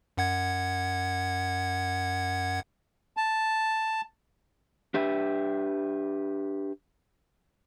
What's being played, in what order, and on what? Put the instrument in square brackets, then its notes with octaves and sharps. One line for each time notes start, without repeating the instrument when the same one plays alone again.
[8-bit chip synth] F#2 F#5 G#6
[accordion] A5
[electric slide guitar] D4 G4 B4 E5